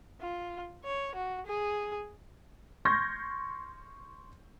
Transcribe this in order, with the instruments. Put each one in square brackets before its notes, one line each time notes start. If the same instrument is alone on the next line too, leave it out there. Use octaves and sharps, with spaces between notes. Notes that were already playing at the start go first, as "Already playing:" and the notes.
[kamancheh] F4
C#5
F#4
G#4
[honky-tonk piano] C6 C#6 F6 G6 G#6 A#6